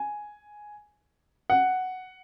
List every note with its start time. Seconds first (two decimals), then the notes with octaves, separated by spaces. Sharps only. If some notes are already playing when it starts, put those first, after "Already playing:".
Already playing: G#5
1.50 F#5